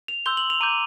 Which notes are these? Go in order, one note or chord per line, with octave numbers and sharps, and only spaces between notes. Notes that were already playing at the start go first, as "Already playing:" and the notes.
F7
C6 E6 G6 G7
F#7
F7
A#5 D6 G6 D#7